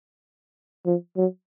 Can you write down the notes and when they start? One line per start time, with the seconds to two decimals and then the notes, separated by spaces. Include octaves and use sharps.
0.86 F3
1.16 F#3